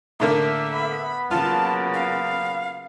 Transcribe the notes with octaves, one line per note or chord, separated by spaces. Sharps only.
A2 D3 A#3 E5
B3 B5
C#3 F#3 A#3 F4 A5
F5